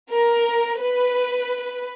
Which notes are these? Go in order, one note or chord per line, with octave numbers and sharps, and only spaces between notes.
A#4
B4